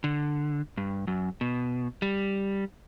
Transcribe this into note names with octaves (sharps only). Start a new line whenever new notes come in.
D3
G2
F#2
B2
G3